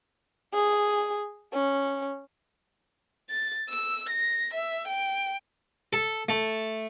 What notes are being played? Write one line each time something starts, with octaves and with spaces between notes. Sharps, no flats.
G#4
C#4
A6
E6
A#6
E5
G5
A4
A3